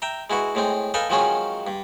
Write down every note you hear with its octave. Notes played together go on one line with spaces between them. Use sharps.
E5 G5 A#5
G#3 E4 F#4 B4
A2 G#3 C4
A4 B4 D#5 F5 G5 G#5
D#3 F3 F#3 G#3 C4 C#4
G2